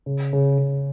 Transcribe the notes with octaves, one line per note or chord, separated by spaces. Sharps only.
C#3
C#3
C#3